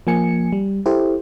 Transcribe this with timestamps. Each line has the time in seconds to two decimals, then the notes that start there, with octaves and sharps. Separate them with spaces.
0.07 F3 A#3 G#5 C#7
0.53 G3
0.86 E4 G4 A4 C5